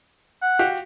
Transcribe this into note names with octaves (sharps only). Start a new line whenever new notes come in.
F#5
F#4 G4 F5